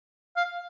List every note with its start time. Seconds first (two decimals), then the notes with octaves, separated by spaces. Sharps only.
0.37 F5